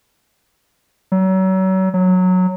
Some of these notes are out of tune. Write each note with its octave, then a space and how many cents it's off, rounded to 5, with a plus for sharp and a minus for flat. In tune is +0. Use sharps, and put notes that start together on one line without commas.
F#3 +35
F#3 -10